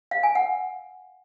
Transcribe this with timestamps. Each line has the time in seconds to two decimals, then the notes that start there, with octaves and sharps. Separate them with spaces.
0.11 F5
0.23 G#5
0.35 F#5